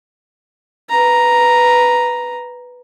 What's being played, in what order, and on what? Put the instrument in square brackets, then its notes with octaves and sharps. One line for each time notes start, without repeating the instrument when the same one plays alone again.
[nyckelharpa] B4 A#5